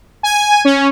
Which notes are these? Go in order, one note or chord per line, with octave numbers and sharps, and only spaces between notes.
G#5
C#4